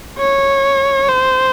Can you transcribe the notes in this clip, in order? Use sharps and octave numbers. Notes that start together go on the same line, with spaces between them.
C#5
C5